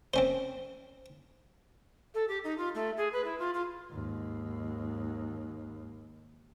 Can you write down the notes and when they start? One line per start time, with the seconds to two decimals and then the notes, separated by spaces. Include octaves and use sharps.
0.14 C4 C#4 C5
2.14 A4
2.28 G4
2.44 D#4
2.57 F4
2.74 A3
2.97 G#4
3.12 B4
3.24 E4
3.38 F4
3.53 F4
3.91 D#2 G#2